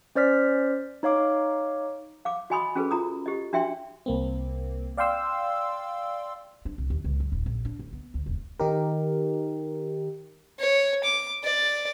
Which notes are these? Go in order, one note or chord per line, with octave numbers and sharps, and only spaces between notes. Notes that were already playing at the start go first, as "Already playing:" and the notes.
C#4 C5 D5 F6 B6
D#4 C#5 F5 D6
F5 D6
F#4 D#5 G#5 B5 C6 D#6
C#4 F#4 G#4 A4 B4
F4 A#5 D#6
G4 D#5
D4 F#4 E5 G5 C6
C2 A#3 C4
D5 F5 G5 C6 E6
D4
C2
D#2
C#2
F#2
D#1
A#1
D4
D1
B3
D2
E1
D#3 D#4 G4 A#4
C#5
D6
D5